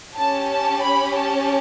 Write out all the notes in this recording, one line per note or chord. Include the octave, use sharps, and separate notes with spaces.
C#4 G4 A5
A5
B5
A5